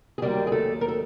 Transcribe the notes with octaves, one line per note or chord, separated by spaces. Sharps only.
G#4
D#2 D#3 F#3 G3 A#3 G4
G#4
A3 A4
A#4
A4